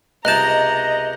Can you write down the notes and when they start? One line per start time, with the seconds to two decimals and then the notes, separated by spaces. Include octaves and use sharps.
0.25 C#2 C3 D#5 A5 A#5 F#6 G6